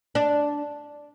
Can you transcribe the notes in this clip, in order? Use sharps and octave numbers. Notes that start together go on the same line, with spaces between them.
D4